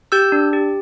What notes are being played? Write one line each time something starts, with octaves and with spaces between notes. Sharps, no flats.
G4 E6 G6
D4
G4